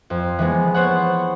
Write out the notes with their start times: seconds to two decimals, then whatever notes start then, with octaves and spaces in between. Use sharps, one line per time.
0.10 F2
0.39 E3 G#3 B3
0.74 B3 C5 C#5 F#5